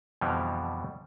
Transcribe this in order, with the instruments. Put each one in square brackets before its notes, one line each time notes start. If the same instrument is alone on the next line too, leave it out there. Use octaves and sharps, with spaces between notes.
[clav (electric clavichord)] F2 B2 D3 E3 F3 G3